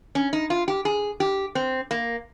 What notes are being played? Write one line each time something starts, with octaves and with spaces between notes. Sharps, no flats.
C#4
D#4
F4
G4
G#4
G4
C4
A#3